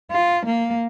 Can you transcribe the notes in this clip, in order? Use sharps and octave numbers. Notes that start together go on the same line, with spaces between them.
F4
A#3